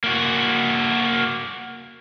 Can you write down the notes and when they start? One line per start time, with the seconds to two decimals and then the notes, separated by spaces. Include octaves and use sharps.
0.04 A#3 F#4